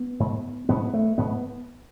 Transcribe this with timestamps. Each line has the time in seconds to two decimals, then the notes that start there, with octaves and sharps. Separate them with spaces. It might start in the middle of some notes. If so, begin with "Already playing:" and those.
Already playing: B3
0.20 G#2
0.69 G#2 B3
0.93 A3
1.18 G#2 B3